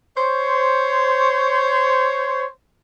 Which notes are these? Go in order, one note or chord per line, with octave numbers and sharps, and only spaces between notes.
C5 C#5